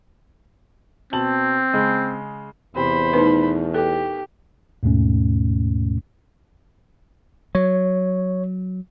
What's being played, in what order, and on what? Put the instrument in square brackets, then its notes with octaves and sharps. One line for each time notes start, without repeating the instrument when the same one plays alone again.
[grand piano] B2 A5 F#7 [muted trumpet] C4
[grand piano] C#3 G#3
[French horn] E2 [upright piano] C3 G4 [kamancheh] C5 B5
[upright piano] B2 D#3 A3 [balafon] D#4 B4
[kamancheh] G4 [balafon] A4
[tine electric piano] D#2 G#2 B2 A3 C#4
[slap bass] F#3 [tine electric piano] C#5